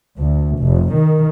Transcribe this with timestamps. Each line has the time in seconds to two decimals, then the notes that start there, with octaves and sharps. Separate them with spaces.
0.19 D2
0.61 F1
0.94 D#3